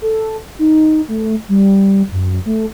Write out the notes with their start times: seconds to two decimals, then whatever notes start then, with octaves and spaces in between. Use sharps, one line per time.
0.02 A4
0.59 D#4
1.08 A3
1.49 G3
2.12 F#2
2.46 A3